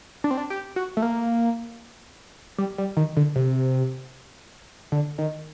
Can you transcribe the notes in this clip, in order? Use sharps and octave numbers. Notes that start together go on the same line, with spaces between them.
D4
C4
D4
G4
F#4
A3
A#3
G3
G3
D#3
D3
C3
D3
D#3